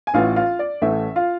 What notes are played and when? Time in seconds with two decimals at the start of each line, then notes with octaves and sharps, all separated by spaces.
0.07 G#5
0.14 A1 A2 E3 A3 F4 F5
0.36 F4 F5
0.59 D5
0.82 A1 A2 E3 A3 E5
1.16 F4 F5